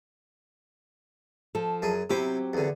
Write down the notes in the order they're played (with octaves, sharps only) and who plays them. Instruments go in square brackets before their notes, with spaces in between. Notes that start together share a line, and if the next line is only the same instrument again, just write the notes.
[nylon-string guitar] F3 A4
[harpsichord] F#2 G#4
[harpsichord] C3 E4 C5 [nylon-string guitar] F#3 C4 G4
[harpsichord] E2 D3